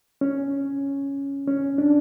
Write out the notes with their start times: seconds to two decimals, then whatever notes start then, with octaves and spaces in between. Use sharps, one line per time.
0.21 C#4
1.47 C#4
1.78 D4